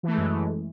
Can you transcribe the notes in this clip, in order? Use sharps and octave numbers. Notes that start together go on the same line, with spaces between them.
F#2 E3 G#3 A3